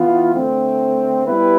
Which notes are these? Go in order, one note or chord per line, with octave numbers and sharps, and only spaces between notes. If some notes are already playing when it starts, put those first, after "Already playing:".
Already playing: E3 B3 F4
D3 A3 C4
G3 B3 E4 B4